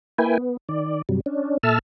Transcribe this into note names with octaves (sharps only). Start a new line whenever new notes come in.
A#3 E4 B4 G5 G#5
B3
D#3 D5
G2 C3 F#3 G3
C#4 D4
A#2 A4 E5 A5 E6 F6